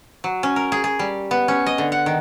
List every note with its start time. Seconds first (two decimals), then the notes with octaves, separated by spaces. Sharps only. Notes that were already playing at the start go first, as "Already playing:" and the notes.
0.24 F#3
0.43 C#4
0.56 A#4
0.72 G#4
0.84 G#4
0.99 G3
1.31 B3
1.48 C#4
1.66 D#5
1.78 D3
1.92 F#5
2.06 D#3